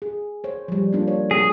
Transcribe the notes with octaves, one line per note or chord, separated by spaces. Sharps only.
G#4
C5 C#5
F3 G3
A#3 D4 F4
C#5
G#4